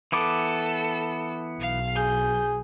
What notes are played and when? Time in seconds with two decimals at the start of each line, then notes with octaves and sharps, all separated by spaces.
0.12 E3 B3 A4 D6 E6
1.60 B1 F5
1.95 G#4 G6